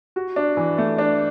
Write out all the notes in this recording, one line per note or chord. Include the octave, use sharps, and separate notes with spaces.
F#4
D4
E3
A3
D4